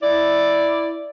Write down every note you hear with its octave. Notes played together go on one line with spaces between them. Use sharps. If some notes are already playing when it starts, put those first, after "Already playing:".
E4 D5